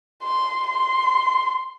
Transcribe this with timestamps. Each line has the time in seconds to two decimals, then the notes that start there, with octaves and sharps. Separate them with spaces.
0.23 C6
0.68 C6